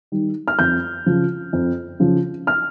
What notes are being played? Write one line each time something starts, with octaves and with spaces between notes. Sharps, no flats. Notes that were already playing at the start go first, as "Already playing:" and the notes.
D#3 G3
F6
F2 G6
C#3 F3
F2
C#3 F3
F6